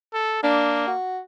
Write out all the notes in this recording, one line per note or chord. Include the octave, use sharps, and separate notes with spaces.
A4
A#3 D4
F#4